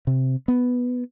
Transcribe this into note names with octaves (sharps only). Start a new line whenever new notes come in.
C3
B3